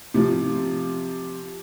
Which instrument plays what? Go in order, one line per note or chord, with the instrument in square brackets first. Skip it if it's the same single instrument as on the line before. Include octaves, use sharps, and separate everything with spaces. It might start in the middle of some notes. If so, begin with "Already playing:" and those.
[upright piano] C3 F3